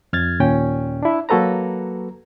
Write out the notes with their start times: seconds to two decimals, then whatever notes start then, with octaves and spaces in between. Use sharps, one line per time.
0.13 F2 F6 G#6 A6
0.40 D#2 A#2 C#4 G5
1.03 D4 E4
1.29 F#3 A#3 F#4 A4 B4 A#5